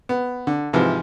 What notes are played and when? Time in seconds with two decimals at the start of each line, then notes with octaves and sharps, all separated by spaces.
0.09 B3
0.47 D3
0.73 G#2 C3 E3 F3